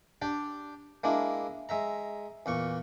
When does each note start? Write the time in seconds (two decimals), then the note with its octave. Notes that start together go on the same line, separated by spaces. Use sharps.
0.22 D4 G4 D5
1.04 G#3 A#3 D4 E4
1.69 G#3 E5 A#5
2.46 E2 A#2 C#6